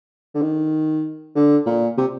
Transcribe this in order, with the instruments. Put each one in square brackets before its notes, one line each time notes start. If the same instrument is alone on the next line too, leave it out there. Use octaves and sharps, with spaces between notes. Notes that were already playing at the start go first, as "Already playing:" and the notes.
[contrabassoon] D3
D#3
D3
A#2
C3